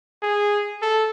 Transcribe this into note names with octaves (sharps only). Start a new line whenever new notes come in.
G#4
A4